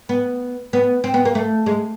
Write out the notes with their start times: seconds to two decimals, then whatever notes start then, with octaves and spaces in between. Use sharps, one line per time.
0.09 B3
0.73 B3
1.04 C4
1.14 B3
1.25 A#3
1.35 A3
1.66 G#3